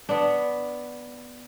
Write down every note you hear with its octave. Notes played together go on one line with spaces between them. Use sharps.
B3 D4